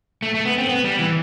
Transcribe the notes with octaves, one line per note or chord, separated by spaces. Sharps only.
A3
A3
B3
C4
B3
G3
E3